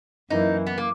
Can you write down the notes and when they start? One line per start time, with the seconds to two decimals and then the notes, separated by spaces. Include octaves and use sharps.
0.30 F#2 E3 A#3 D#4 E4
0.67 B3
0.78 A#3